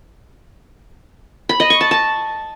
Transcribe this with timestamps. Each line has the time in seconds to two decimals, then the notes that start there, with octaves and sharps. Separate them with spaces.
1.49 B5
1.60 D#5
1.70 C#6
1.81 A5
1.91 A5